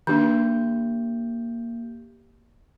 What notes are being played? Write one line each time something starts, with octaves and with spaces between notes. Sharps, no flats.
D#3 A#3 D4 G4 G6